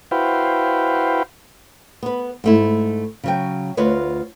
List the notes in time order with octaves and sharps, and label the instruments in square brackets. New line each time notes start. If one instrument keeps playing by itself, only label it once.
[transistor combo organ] E4 F#4 B4 C5 F5 G5
[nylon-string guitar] B3 B4
G#2 A3 E4
C#3 F#3 G5
D2 F4 B4 C#5 D#5